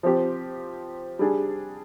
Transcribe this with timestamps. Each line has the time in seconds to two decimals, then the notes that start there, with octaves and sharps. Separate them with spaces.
0.03 F3 C4 G4
1.19 G3 D4 G#4